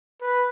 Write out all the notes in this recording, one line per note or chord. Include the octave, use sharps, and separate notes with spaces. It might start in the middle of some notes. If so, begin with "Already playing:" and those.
B4